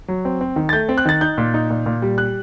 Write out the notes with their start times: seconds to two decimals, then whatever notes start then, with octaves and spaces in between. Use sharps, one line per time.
0.08 F#3
0.25 C4
0.41 C4
0.56 D#3
0.69 A6
0.73 A3 G6
0.89 C4
0.98 F#6
1.05 D#3 A6
1.21 D#4 G6
1.38 A#2
1.54 D#4
1.70 A#2
1.86 A#2
2.02 G3
2.18 F#6